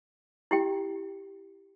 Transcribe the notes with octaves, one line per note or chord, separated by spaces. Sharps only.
E4 G4 G5